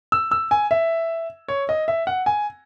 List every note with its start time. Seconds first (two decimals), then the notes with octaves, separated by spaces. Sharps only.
0.12 E6
0.31 E6
0.51 G#5
0.71 E5
1.48 C#5
1.69 D#5
1.88 E5
2.07 F#5
2.26 G#5